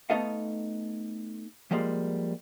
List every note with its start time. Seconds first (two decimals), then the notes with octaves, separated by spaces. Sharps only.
0.10 A3 B3 D#4 A4 D#5 F5
1.71 F3 G3 G#3 A#3